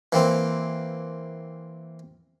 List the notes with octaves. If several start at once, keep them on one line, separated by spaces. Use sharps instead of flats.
E3 A#3 C4